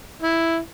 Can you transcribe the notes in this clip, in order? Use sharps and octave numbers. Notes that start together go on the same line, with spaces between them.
E4